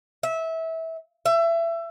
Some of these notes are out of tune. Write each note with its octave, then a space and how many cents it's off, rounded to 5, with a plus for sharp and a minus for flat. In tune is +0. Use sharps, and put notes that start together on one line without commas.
E5 -20
E5 +25